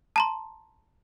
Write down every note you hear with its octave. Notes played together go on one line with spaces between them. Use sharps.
A5 A#5 C6